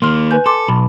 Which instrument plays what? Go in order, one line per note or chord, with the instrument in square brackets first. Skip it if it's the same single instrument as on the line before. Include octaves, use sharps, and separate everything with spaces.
[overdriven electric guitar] D#3 A#3 [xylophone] C6 F6
[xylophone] B4 G#5 G6
[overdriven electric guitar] A4 [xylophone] C6 D6
[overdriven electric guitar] B1 [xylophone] A5 B5